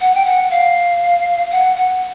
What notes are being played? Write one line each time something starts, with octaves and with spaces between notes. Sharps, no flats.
F#5
G5
F#5
F5
F#5
F#5